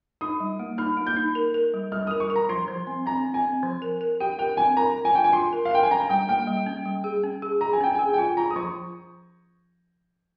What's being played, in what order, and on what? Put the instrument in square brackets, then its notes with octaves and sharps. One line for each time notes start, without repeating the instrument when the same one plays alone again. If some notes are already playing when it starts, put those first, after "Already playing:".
[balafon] D#4 [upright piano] D#6
[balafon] G3
A#3
[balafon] D#4 [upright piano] F6
[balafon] A#3
[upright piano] G6
[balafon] D#4
A#4
A#4
G3
[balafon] G3 [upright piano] F6
[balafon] A#4 [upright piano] D#6
[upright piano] C#6
[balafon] A#4
[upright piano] A#5
[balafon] F3 [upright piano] C6
[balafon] F3
C4
[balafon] C4 [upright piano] A#5
[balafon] C4
[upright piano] G#5
[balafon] C4
F3
A#4
A#4
[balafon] G4 [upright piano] G5
[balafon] A#4 [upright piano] G5
[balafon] C4 [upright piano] G#5
[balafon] A#4 [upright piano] A#5
[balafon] A#4
[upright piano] G#5
[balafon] F4 [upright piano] G5
[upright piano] G#5
[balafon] F4 [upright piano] C6
[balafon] A#4
[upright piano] F5
[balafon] A#4 [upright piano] G5
[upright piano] G#5
[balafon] C#4 [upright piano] A#5
[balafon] G3 [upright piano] G5
[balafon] A#3 [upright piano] G5
[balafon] G3
C#4
G3
G#4
C#4
G#4
[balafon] G#4 [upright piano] A#5
[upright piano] G#5
[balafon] C#4 [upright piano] G5
[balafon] G#4 [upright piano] G#5
[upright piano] G5
[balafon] F4 [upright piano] G#5
[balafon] F4 [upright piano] A#5
[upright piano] D#6
[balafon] F3 [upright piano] C#6